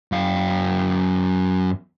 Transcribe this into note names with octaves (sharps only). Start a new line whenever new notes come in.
F#2 F5